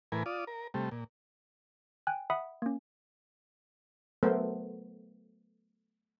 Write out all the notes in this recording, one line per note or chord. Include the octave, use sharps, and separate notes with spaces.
A2 E3 A#4 B4 G#5
F4 D5 D#6
A#4
C3 G3 A3
A#2
G5 G#5 F#6
E5 F#5 B5 D#6
A#3 C#4
F#3 A3 B3 A#4 C5